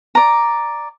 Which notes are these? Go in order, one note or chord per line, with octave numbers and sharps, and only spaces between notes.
D5 A#5